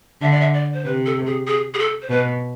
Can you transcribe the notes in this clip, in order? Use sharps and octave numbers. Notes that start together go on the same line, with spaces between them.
D3 E5
D5
E5
D5
C5
C3 B4
A4
G#4
G#4
G#4
A4
C5
B2 B4